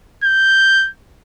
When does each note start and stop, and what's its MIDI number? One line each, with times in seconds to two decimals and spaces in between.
0.24 0.89 91